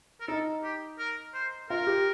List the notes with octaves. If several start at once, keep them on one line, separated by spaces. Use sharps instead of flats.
A#4
D#4 A4
G4
A#4
C5
F4 A#4
G4